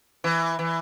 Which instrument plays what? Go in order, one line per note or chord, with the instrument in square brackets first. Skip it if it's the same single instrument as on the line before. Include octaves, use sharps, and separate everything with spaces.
[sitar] E3
E3